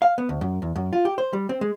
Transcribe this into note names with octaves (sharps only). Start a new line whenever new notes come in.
F5
B3
D2
F#2
E2
F#2
F4
G4
C5
G3
C4
G#3